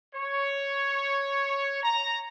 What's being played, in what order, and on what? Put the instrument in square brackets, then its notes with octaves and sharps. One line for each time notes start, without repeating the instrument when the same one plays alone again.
[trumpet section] C#5
A#5